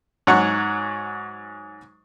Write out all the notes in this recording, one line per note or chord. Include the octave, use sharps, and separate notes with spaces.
G#2 F#3 C#5 F#5 C#6